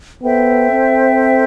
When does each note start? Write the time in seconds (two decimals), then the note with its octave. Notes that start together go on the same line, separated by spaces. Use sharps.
0.22 B3 A4 C5 E5 G5
0.71 C4